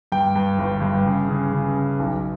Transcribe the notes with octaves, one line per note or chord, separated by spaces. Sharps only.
G2 G5
G2
G1
G2
C#3
C#3
C#3
C#3
B1